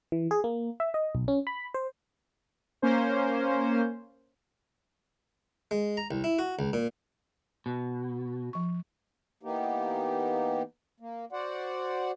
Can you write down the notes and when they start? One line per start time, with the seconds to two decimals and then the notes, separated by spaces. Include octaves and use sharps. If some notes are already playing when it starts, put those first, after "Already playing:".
0.12 E3
0.31 G#4
0.44 A#3
0.80 E5
0.94 D#5
1.15 B1
1.28 C#4
1.47 B5
1.74 C5
2.82 A#3 C#4 C5
5.71 G#3
5.97 A#5
6.11 C2
6.24 E4
6.39 F#4
6.59 C#2
6.73 A#2
7.66 B2
8.53 F3 C#6
9.43 E3 A#3 B3 D#4 G4
11.00 A#3
11.32 F#4 C5 D5 F#5